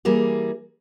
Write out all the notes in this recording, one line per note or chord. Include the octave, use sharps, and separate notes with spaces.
E3 G3 A#3 G#4